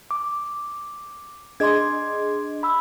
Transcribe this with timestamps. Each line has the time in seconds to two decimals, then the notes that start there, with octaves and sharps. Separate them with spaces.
0.11 D6
1.60 D4 G#4 D#5 C6 D6 G#6
2.63 B5 E6